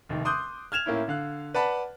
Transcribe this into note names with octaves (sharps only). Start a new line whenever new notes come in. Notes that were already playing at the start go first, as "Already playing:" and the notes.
F1 D#2
C6 D6 D#6 F#6 G6
F6 G#6 E7 F7
A2 A#3 C#4 E4
D3 F5 F#6
B4 D5 F#5 A5 B5